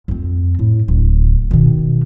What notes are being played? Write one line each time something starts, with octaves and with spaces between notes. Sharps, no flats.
F2 C4
A2
D1
B2 D#3